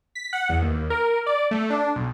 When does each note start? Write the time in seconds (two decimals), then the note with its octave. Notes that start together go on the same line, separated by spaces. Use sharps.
0.15 B6
0.33 F#5
0.49 E2
0.62 D#2
0.90 A#4
1.05 A#4
1.26 D5
1.51 A3
1.70 D4
1.96 B1